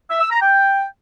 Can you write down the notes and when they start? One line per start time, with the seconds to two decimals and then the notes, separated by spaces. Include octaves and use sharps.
0.10 E5
0.20 E6
0.30 A#5
0.41 G5